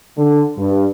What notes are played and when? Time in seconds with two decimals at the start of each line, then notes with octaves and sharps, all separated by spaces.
0.17 D3
0.57 G2